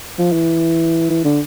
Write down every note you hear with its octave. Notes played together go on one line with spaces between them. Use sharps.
F3
E3
E3
D3